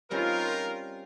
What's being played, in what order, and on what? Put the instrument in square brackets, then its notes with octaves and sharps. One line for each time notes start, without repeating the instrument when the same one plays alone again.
[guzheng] G3 C4 C#4 [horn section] D#4 A#4 [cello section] F4